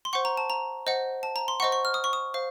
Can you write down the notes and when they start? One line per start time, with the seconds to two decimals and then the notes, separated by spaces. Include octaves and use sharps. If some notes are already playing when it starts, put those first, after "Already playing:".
0.05 C6
0.13 C5 F#5 C#6
0.25 A#5
0.37 A5
0.50 A#5
0.87 C5 D#5 F#5
1.23 A5
1.36 A#5
1.48 C6
1.60 C5 D#5 F#5 C#6
1.72 C#6
1.85 F6
1.94 D#6
2.04 C#6
2.13 D#6
2.34 C5 F5